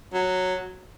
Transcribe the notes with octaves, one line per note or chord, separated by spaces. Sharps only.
F#3